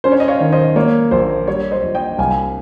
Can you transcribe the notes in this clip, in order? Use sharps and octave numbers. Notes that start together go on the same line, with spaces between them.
C#4 C5
C#5
D#5
C#5 F5
D#3
C5 D#5
A#3 C#5
A#1 C5
G3 C#5
C5 D#5
A#1
D#5 G5
C2 F5 G#5